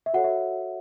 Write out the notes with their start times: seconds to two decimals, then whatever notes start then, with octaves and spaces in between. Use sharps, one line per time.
0.06 E5
0.14 F#4 A4 C#5 F#5
0.24 E5